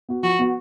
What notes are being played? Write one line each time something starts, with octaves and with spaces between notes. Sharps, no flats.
B3 F#4
F3 F#4
B3 F#4